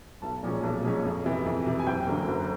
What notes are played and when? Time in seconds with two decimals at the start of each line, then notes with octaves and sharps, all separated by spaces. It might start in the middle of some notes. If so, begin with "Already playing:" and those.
0.22 B1 A5
0.43 A#2 F3 G#3 C#4
0.63 B1
0.84 A#2 F3 G#3 C#4
1.05 F2
1.25 C3 E3
1.46 F2
1.66 C3 E3
1.79 G#5
1.87 F#1 G5
2.07 F#2 D3 F#3 A#3
2.28 F#1